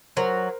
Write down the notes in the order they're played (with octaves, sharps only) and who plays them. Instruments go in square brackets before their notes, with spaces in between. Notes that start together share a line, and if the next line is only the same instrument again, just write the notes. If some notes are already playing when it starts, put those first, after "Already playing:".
[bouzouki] F#3 [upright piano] A#4 C5